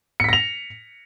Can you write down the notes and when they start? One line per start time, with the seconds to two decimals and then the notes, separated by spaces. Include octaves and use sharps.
0.20 C#7
0.24 B6
0.29 A#6
0.33 F7